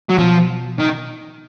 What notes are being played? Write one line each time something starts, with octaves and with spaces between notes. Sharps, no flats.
F#3
B2 F3
D#3